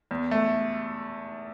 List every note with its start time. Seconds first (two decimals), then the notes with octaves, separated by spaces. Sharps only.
0.11 E2
0.31 A3